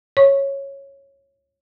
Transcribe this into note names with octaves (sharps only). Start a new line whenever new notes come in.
C#5 C#6